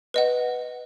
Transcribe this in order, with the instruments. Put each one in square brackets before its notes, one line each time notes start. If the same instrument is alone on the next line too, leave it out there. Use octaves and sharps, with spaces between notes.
[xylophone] B4 D#5 F#5